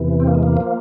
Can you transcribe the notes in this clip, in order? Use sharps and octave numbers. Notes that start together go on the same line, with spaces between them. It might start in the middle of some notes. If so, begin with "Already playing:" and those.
Already playing: E2 C3 E3
C4
A#3
G#3
A#3
F3